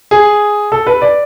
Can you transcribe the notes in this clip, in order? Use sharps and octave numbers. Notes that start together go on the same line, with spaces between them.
G#4
A4
B4
D5